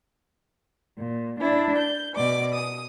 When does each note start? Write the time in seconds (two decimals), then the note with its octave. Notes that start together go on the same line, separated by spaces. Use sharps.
0.99 A#2
1.39 D4 E4
1.77 G6
2.15 B2 D5 D6
2.53 D#6